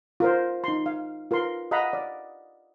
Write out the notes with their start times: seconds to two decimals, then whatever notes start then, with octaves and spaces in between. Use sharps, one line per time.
0.20 F4 A#4 C5
0.64 D#4 C6
0.86 F5
1.31 F4 A#4 B4 C6
1.71 D#5 F5 F#5 A#5 B5
1.93 D5